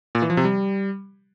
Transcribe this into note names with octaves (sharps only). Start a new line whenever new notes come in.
A#2
E3
F3
C3
G3